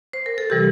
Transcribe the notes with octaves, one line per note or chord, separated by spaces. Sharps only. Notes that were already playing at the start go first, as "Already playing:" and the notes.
C5
A#4
A4
C3 E3 G3 G4